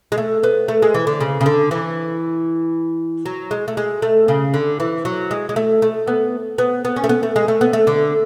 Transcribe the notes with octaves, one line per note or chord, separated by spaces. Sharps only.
G#3
A3
B3
A3
G#3
E3
D3
C#3
C#3
D3
E3
F#3
G#3
A3
G#3
A3
C#3
D3
E3
F#3
G#3
G#3
A3
A3
B3
B3
B3
C#4
A3
B3
A3
G#3
A3
B3
A3
D3